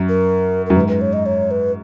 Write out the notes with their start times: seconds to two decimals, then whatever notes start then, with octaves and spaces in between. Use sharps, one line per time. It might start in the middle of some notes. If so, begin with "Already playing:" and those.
Already playing: F#2
0.09 A#4
0.66 F#2 A#4
0.76 G#2 B4
0.88 B4
1.01 C#5
1.13 D#5
1.26 C#5
1.51 B4